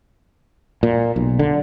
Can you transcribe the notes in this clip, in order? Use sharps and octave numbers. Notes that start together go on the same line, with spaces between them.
A#2
B1
D3